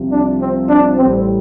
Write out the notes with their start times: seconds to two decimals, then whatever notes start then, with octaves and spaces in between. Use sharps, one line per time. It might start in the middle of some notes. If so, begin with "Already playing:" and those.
Already playing: C2 C3 F3
0.11 D4
0.40 C4
0.69 D4
0.98 A1 A2 G3 C4